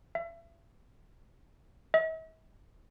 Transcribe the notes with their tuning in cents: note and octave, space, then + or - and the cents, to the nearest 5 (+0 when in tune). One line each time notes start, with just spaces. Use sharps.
E5 +35
E5 -45